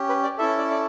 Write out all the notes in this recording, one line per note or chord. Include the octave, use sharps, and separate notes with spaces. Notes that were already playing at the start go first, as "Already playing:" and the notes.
Already playing: C#4 G4
B4
D5
C#4 E4 A4 E5
D5
D5